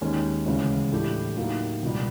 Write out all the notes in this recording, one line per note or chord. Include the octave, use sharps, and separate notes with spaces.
D#2 D#3 G#3 C#4
D2 C#3 E3 G#3 C#4
A2 E3 A3 D4 G4
A2 F#3 A#3 D#4 G4
C#2 B2 G3